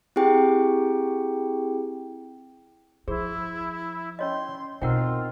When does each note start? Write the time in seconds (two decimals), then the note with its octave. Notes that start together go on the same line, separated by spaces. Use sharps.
0.16 C4 E4 G4 G#4 G5
3.08 F3 E4 G#4 C5
4.19 C#4 C#5 D#5 C6
4.81 B2 C4 D#4 F4 A#4 F#5 G5